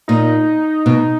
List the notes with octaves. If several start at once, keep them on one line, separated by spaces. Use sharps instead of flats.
A#2 D#4
B2